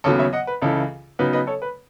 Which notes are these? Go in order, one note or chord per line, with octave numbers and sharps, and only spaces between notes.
D#2 C#3 F#3 B3 A4 C#5
C#5 E5
D#5 F#5
B4
C#2 C#3 E3 A4
C#3 F#3 B3 D#4 B4
B4 D#5
A4 C#5
B4